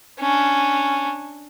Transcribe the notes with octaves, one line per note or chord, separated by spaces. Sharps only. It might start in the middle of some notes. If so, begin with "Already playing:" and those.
C#4 D4